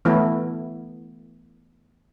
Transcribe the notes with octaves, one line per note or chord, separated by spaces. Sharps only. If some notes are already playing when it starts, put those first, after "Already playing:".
E3 A3 B3 E4